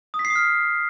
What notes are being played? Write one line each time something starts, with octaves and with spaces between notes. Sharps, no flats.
D#6
B6
C7
D#6
F6